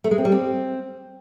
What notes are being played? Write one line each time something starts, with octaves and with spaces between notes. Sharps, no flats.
A3
G#3
C4
G3
C4